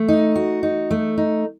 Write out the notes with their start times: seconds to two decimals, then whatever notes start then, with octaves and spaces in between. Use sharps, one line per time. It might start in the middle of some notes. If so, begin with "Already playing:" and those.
Already playing: A3
0.08 D#4
0.36 F#4
0.63 D#4
0.91 A3
1.18 D#4